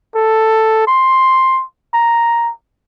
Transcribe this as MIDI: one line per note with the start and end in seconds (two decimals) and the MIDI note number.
0.15 0.84 69
0.87 1.64 84
1.94 2.52 82